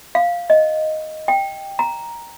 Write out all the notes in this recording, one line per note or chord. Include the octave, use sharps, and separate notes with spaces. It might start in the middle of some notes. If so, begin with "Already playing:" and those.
F5
D#5
G5
A#5